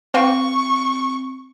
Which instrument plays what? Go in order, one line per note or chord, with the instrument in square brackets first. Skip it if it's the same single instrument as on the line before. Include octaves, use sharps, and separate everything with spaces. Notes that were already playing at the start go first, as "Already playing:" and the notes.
[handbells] C4 [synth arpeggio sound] B4 F5 G5 [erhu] C#6